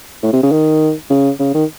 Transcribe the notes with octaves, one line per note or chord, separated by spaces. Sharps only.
A2
C3
C#3
D#3
C#3
C#3
D#3